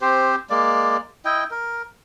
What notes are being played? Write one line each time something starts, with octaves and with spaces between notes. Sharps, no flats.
C4 G4 C5
G#3 A#3 D5
E4 D#5 G5
A#4